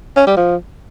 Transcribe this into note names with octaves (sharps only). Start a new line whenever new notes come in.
C#4
G3
F3